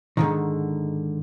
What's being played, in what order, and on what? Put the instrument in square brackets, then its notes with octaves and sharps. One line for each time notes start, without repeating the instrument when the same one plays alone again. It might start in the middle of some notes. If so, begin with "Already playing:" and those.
[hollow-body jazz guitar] G#2 D3 D#3